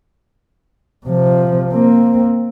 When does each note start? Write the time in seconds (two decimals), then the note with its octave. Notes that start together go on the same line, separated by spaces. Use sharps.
1.06 C3 F3
1.72 A#3 C4